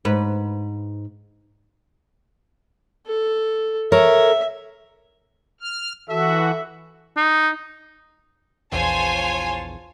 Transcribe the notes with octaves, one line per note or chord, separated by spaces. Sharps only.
G#2 B4
A4
A4 A#4 C#5 E5
F6
E3 F#4 A4 E5
D#4
A#1 E2 F4 C5 C#5 G#5 A5